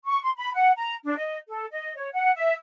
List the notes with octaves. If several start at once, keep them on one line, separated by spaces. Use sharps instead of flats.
C#6
C6
B5
F#5
A#5
D4
D#5
A4
D#5
C#5
F#5
E5